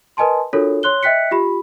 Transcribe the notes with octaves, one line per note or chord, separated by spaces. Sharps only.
A#4 B4 D#5 G#5 A5 C6
D4 F4 F#4 A4 A#4 C#5
C#5 C6 F#6 G7
D#5 E5 G5 F#6 B6 C#7
F4 G4 B5